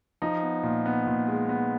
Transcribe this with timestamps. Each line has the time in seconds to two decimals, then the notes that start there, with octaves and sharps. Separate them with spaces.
0.22 F3 D#4
0.43 B3
0.63 A#2
0.86 B3
1.07 A#2
1.28 G#3
1.49 B3